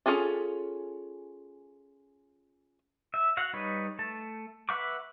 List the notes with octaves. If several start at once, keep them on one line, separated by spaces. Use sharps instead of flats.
C#4 D4 F4 G#4 A4
E5
F#4 F5 F#5
G3 D#4 B4 C#5
A3 A5
B4 E5 F#5 C#6 D6